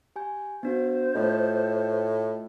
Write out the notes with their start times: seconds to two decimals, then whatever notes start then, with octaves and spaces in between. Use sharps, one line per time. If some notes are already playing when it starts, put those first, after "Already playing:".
0.16 G4 G#5 G6
0.63 B3 D4 F#4 C5
1.15 A2 A3 F4 D#5